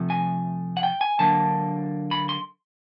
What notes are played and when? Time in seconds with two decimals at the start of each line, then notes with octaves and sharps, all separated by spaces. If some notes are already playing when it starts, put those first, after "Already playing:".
Already playing: C3 F3 A3
0.10 G#5
0.77 F#5
0.83 G5
1.01 G#5
1.19 D3 F#3 A#3 D4 A5
2.11 B5
2.29 C6